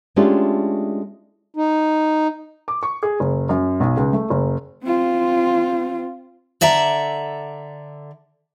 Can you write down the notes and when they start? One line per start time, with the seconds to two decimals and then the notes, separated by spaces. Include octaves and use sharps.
0.16 G#3 A3 C#4 D4 F4 G4
1.56 D#4
2.68 D6
2.83 C#6
3.03 G#4
3.20 F#1
3.49 F#2
3.80 B1
3.97 C#2
4.13 A3
4.30 F#1
4.84 C4 F4
6.61 D3 D5 E5 F#5 A#5